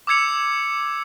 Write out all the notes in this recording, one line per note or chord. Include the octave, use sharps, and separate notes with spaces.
D6 E6 G#6 C#7 F7